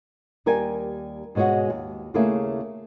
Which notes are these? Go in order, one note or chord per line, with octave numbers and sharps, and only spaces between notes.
D#2 G3 A#4 G#5 A5
G#2 B2 G#3 C#4 F#4
D#2
D#2 C#3 A3 A#3 E4 G#4